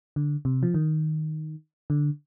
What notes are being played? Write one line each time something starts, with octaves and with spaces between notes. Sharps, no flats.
D3
C3
F3
D#3
D3